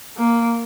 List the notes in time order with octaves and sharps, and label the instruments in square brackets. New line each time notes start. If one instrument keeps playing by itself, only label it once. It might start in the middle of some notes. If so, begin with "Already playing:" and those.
[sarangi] A#3